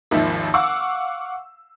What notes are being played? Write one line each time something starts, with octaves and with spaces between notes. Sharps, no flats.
G#1 D#2 D#3 F3 E5
F5 F#5 C#6 D6 E6